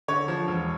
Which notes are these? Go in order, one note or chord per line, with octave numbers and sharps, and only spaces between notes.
D3 C#5
F3
E1